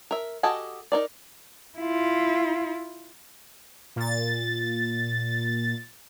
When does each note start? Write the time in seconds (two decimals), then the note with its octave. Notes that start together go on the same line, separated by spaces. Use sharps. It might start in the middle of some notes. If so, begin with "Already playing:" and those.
0.11 A#4 E5
0.43 F#4 G4 A4 D#5 G#5
0.92 D#4 A#4 D5
1.78 E4 F4
3.96 A#2 A6